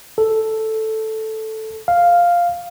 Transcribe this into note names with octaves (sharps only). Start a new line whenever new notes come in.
A4
F5